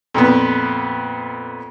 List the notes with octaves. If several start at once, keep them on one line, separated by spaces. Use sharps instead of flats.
F2 A#2 B3